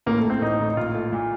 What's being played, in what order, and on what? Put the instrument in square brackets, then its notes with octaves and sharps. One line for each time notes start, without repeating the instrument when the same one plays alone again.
[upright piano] A1 [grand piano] A#3
[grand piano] A3
[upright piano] A1
[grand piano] C4
[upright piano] A1 [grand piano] D#4
[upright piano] A1
[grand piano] D#4
[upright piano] A#1 [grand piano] F4
[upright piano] A3
A#2